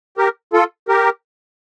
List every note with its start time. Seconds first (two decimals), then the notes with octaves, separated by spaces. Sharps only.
0.17 G4 A#4
0.53 F4 A4
0.89 G4 A#4